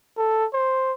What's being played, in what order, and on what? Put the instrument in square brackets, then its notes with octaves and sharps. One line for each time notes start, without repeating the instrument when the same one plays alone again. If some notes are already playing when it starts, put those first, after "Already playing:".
[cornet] A4
C5